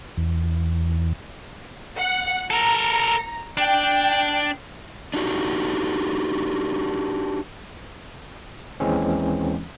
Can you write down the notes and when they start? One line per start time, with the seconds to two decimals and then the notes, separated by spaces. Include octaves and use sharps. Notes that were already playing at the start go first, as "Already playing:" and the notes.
0.17 E2
1.97 F#5
2.50 A4 A#4 A#5
3.58 D4 G5
5.14 D4 D#4 F#4 G4
8.80 D#2 E3 G#3 C4 C#4